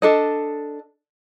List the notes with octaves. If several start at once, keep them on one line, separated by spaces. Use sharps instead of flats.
D4 A4 D#5